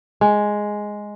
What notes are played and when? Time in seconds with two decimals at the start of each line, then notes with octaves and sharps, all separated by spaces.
0.21 G#3